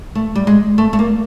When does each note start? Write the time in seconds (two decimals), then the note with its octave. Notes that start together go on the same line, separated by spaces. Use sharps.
0.15 A3
0.35 G3
0.47 G#3
0.78 A3
0.93 A3
0.99 A#3